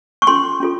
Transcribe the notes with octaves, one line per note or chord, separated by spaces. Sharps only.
C#6
C#4 F4 A4 C6
C#4 F4 A4